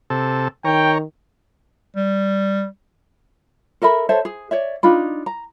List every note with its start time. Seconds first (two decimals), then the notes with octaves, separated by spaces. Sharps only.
0.10 C3 A4
0.65 D#3 C#5 G5 A#5
1.96 G3
3.82 A4 A#4 E5 B5
4.09 A4 C5 C#5 E5
4.25 G#4
4.51 C#5 D5 E5
4.83 D4 D#4 F4 B5
5.26 A#5